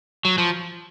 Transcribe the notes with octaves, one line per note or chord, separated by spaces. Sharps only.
F#3
F3